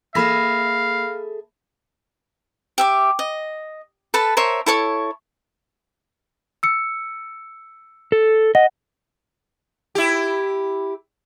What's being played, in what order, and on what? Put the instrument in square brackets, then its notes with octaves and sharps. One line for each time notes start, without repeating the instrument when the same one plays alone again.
[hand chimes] A#3 B5 A#6 [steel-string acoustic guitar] G#4 A4 E5 [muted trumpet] F5
[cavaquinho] G4 E5 D6
D#5
A4 B4 A5 B5
A#4 C5 C#5 E5
E4 A4 C#5 C#6
[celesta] E6 C#7
[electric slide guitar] A4
[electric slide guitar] D#5 [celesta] F#5
[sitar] E4 G4